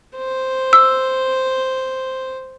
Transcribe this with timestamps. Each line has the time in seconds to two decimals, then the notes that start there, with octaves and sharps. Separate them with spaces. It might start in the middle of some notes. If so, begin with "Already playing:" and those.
0.17 C5
0.73 E6